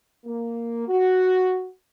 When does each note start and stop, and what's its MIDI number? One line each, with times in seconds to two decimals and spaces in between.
0.25 0.86 58
0.88 1.70 66